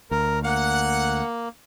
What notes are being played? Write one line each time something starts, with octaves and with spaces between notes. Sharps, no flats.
D2 A#4
A#3 F#5